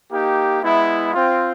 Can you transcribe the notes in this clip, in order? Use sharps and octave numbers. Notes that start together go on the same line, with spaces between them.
A#3 D#4 G4
G#3 B3 E4
C4 F4